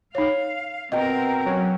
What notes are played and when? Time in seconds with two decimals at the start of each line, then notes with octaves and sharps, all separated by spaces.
0.15 D#4 C#5 F5
0.92 B2 C4 A#4 D#5 G5 A#5
1.45 F#3 C#4